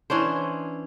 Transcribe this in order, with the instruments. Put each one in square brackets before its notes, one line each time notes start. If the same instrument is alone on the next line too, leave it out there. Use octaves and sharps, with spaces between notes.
[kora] E3 C#4 D4 C5